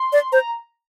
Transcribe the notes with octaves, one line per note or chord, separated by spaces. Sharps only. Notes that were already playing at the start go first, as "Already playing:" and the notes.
Already playing: C6
D5
C5 A#5